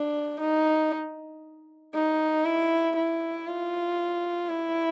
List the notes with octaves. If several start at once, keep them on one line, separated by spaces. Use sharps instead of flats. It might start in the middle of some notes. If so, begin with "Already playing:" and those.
Already playing: D4
D#4
D#4
E4
E4
F4
E4